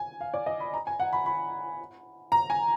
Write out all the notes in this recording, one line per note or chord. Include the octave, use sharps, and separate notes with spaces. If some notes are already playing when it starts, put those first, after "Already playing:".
Already playing: G#5
F5
D5
D#5
B5
A#5
G#5
F#5
B5
B5
A#5
G#5